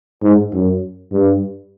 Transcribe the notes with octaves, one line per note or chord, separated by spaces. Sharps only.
G#2
F#2
G2